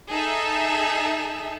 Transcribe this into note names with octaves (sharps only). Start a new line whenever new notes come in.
D#4 G#4 A4 E5